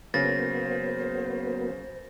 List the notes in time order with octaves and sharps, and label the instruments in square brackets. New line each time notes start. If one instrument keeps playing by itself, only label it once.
[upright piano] C#3 [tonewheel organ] F#3 A#3 B3 [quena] C5 [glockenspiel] A6 A#6